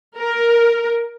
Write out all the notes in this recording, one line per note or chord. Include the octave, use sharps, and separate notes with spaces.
A#4